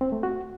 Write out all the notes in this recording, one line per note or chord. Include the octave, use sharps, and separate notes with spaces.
C4
A3
F#4